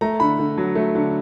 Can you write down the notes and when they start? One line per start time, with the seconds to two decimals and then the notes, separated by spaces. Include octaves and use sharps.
0.01 A3 A#5
0.20 D3 B5
0.39 D3
0.58 F#3
0.75 A3
0.95 D3